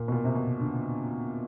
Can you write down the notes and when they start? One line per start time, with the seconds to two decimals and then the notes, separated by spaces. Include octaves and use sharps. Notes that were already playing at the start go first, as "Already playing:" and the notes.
Already playing: A#2
0.08 B2
0.12 A#2
0.25 C3
0.35 B2
0.59 D3